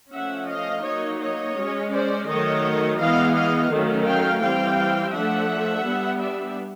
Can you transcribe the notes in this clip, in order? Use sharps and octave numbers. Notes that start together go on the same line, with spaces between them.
F3 A3 C#4 E5 F#5
D#5 F5
F#3 A#3 D#4 C#5 D#5
C#5 D#5
G#3 C#4
C5 D5
D#3 F#3 A3 C#5 D#5
E3 G#3 B3 D#5 F5
D#5 F5
D#3 F#3 A3 C#4
F5 G5
E3 G3 C4 F5 G5
F3 A3 D4 E5 F#5
G3 B3 D4
D5 E5